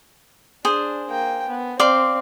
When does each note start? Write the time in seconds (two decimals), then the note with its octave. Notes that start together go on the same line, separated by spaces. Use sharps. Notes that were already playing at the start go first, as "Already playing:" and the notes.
0.65 D4 G#4 C5
1.09 A#3 G5
1.49 B3
1.80 C4 D5 F5 C6